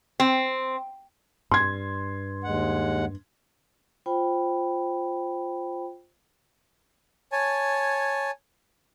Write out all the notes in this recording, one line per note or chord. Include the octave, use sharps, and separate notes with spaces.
C4
G2 C6 G#6
D#2 G#3 F#5
F4 C5 G5 B5
C#5 G#5 A5